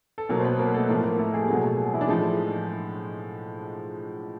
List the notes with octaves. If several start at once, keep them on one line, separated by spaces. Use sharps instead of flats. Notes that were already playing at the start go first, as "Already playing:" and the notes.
A4
B2 F#3 A#3 A#4
C5
B3 B4
A#3 A#4
A3 A4
A2 F3 A3 A#3 A#4
A#3 A#4
A3 A4
G#4
G4
B2 F#3 G#3 A3 G#4
E3 E4
D4
A2 F3 G#3 D#4